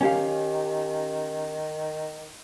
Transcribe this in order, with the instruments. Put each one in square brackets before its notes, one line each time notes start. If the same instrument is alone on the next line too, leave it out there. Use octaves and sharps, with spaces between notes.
[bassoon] D#3 [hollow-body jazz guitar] C#4 G4 F5